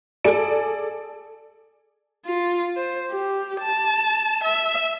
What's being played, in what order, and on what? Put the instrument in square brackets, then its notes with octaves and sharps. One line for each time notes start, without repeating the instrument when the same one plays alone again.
[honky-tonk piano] G#4 A4 D5 D7
[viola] F4
C5
G4
A5
E5